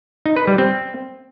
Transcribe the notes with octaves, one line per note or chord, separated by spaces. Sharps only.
D#4
B4
G3
C4